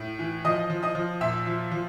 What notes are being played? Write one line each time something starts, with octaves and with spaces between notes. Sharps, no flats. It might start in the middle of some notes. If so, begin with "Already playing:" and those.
Already playing: A2
E3
F3 D#5 D#6
F3
D#5 D#6
F3
A#2 E5 E6
F3
F3